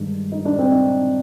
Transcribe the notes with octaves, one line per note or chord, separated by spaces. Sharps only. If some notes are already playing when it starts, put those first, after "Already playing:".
Already playing: G2 D#3 G#3
D#4
D4
C4
D#4